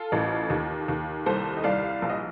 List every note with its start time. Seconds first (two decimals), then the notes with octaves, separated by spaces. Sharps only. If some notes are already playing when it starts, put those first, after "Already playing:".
Already playing: F4 A4
0.12 A1
0.50 D#2
0.88 D#2
1.26 C2 A4 C5
1.57 D#5
1.64 C2 D5 F5
2.02 A#1 F5
2.10 D#5